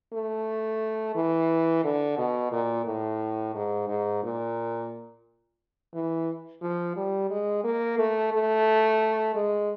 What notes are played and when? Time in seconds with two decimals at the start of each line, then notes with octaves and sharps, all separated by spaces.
0.13 A3
1.15 E3
1.84 D3
2.18 B2
2.52 A#2
2.86 A2
3.55 G#2
3.88 G#2
4.23 A#2
5.94 E3
6.62 F3
6.96 G3
7.30 G#3
7.64 A#3
7.98 A3
8.33 A3
9.35 G#3